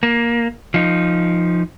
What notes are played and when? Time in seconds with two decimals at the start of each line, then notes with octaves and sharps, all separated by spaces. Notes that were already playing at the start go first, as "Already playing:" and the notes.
0.03 A#3
0.74 F3 D#4